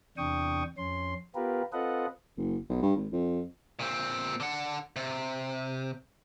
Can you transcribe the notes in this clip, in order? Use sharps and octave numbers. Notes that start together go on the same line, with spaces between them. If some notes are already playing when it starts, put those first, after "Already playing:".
E2 C3 D4 G5 C#6 D#6
F2 C#4 C6
B3 F4 G4 A#4 B4
C4 F4 A4 B4 D#5 F#5
F#1
B1
G2
G#1
F2
A#2 C4
D3 F#5
C3